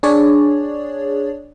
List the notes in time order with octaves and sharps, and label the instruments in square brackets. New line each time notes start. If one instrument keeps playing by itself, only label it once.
[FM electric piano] D4 G#4 C#5 D5